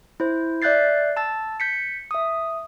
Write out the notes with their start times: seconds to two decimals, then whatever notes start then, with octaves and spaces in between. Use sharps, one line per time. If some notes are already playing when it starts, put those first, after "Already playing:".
0.20 E4 C5
0.62 D5 E5 F#6 G6 A6 C7
1.17 A5 E6 A6
1.60 G6 B6 C#7
2.11 E5 D#6